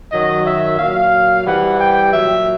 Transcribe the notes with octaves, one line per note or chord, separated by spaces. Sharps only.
F#2 D#3 F#3 D#5
E5
A#2 F#3 F5
C3 E3 G3 F#5
G5
A#2 F#3 E5